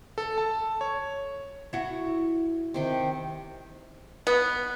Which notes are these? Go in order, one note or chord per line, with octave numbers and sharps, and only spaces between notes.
A4
A5
C#5
E4 F#4
C3 D#3 G5
B3